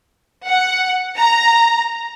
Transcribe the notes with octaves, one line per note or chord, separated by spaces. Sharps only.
F#5
A#5